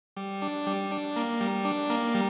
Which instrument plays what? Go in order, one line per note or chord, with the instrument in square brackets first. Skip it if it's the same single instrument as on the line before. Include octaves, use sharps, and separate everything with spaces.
[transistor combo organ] G3
D4
G3
D4
A#3
G3
D4
A#3
G3